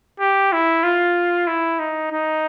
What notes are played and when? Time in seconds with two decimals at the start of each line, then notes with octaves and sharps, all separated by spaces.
0.20 G4
0.53 E4
0.83 F4
1.47 E4
1.79 D#4
2.12 D#4